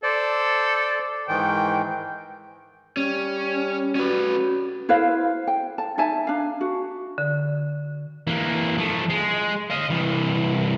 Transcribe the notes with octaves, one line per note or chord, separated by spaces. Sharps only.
A4 C5 D5
G#2 D#3 E3 G5
G3 C#4
C#4 F#4 B4
E4 B4 C5 F5
G5
A5
D#4 E5 G#5 A5
D4 F5
F#4
D3
E3 A#3
F3 A3
G#3
D#5 F5
C2 E3